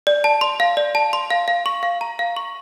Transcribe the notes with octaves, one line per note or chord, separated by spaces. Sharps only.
D5
A5
C6
F5
D5
A5
C6
F5
F5
C#6
F5
A#5
F5
C#6